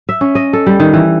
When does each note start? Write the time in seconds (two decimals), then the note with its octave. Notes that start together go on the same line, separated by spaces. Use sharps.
0.09 E5
0.21 C#4
0.35 D#5
0.53 A4
0.66 G3
0.80 D#3
0.93 E3